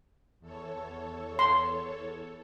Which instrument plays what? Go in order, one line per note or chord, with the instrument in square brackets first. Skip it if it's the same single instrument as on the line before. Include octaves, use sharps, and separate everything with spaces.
[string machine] E2 A4 C#5
[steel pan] C6